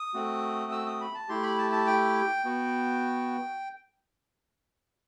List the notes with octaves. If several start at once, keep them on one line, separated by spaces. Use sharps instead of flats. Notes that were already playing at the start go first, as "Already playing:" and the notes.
Already playing: D#6
A3 C4 F#4
E6
D#6
B5
A5
A3 E4 G4 C6
B5
A5
A5
G5
B3 F#4